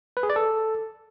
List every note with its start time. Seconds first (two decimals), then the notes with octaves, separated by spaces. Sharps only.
0.17 B4
0.23 G#4
0.30 D5
0.36 A4